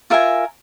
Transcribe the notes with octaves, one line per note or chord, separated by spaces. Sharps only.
F4 A#4 E5 G#5